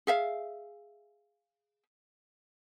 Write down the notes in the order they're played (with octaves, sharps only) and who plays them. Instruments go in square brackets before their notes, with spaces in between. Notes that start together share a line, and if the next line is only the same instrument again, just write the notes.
[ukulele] G#4 E5 F5